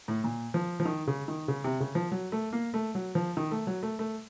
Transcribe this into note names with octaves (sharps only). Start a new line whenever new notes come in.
A2
A#2
F3
F3
D#3
C#3
D#3
C#3
C3
C#3
F3
F#3
A3
A#3
A3
F#3
F3
D#3
A3
F#3
A3
A3